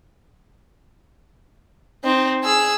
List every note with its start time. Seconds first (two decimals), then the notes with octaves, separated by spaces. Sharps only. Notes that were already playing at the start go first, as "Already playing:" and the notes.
2.04 C4 D#4
2.44 G#4 E6